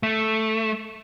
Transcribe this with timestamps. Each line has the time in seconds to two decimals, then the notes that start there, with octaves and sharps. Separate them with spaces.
0.03 A3